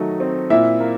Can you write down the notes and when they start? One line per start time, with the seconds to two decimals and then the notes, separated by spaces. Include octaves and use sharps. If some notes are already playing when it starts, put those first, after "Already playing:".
Already playing: D#3 F#3 A3 D#4 D#5
0.20 C4
0.50 A#2 E4 E5
0.80 A#3